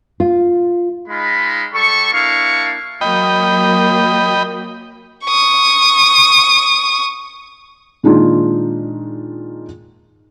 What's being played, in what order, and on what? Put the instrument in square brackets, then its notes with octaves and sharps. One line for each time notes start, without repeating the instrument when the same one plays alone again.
[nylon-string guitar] F4
[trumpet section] G#3 D#4 F4 B5
G3 A4 C#6
A#3 D4 E4 F5 C#6
[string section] F#3 A#3 [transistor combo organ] D#5 G5 B5
[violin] C#6 D#6
[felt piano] A#2 D#3 G#3 D4 D#4 F4